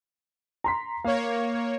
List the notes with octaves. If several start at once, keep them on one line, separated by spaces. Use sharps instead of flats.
A#5 C6 B6
A#3 C#5 F5